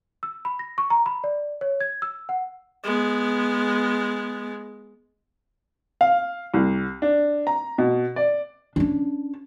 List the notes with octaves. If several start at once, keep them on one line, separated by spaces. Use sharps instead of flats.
E6
B5
A#6
C#6
A#5
B5
D5
C#5
G#6
E6
F#5
G#3 B3
F5
C2
D4
A#5
B2
D5
C#4 D4